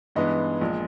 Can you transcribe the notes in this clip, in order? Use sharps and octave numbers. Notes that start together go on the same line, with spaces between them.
G2 E3 G#3 B3 D#4 D#5
A#1 A#2 G#3